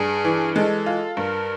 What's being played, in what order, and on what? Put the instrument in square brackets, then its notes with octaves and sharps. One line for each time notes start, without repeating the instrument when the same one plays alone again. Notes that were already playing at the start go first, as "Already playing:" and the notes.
Already playing: [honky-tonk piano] G2 [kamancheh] G#4
[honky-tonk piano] E3
[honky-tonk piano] G#3 [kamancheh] A4
[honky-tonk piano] F4
[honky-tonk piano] G2 [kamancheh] A#4